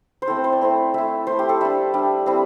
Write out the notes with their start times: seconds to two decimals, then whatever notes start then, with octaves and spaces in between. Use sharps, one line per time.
0.22 C5
0.28 A3 C4 E4 A4
0.44 C5
0.53 D5
0.61 A3 C4 E4
0.94 A3 E4 E5
1.27 A3 E4 C5
1.39 G4
1.49 A4
1.61 G3 D4 E5
1.94 G3 D4
2.26 G3 C4 E4